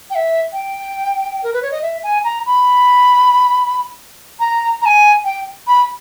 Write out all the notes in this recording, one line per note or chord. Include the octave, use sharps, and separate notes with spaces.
G5
E5
G5
A#4
B4
C#5
D#5
E5
G#5
A#5
B5
A#5
A#5
G#5
G5
B5